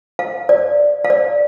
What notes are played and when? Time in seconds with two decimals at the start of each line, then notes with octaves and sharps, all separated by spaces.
0.19 F5
0.49 D5
1.05 F5
1.10 D5